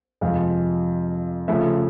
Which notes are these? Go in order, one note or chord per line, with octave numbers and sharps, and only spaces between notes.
F2 C3 F3 G#3 F5
C#3 F3 A3 E5